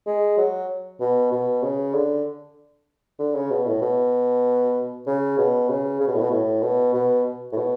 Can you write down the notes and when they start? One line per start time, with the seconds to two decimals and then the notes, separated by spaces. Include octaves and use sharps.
0.07 G#3
0.38 F#3
1.01 B2
1.32 B2
1.63 C#3
1.94 D3
3.19 D3
3.35 C#3
3.50 B2
3.66 A2
3.82 B2
5.07 C#3
5.38 B2
5.69 C#3
6.01 C#3
6.07 B2
6.14 A2
6.21 B2
6.31 A2
6.62 B2
6.94 B2
7.52 A2
7.56 B2